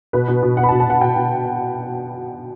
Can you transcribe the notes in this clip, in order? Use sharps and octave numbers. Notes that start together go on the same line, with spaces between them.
B2 B4
B2
B2
B2 F#5
B5
A5
B2
A5
B2 F#5
B2 G5
B2